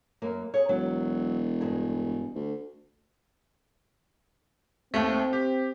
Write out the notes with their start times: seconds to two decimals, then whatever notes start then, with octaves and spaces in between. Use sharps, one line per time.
0.22 F#2 A#3
0.54 G#4 C#5
0.69 E1 F#3
1.61 G2 G#4
2.35 D2
4.94 D#2 A3 C4
5.33 G4